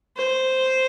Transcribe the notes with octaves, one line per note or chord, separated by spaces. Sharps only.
C5